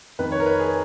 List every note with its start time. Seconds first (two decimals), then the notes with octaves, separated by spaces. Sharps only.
0.19 F2 D#3 B4
0.32 C#5
0.40 A#4
0.46 B4
0.60 G#4